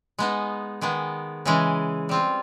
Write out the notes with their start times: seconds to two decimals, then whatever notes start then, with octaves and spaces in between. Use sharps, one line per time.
0.19 G#3 B3 D#4
0.81 D#3 G#3 B3
1.45 C#3 E3 G#3
2.09 G3 C4 F4